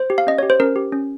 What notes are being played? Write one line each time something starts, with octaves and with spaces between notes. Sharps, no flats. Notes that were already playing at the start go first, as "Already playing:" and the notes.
Already playing: C5
G4
F5
C#4 D#5
G4 C#5
C5
C#4 A#4
G4
C#4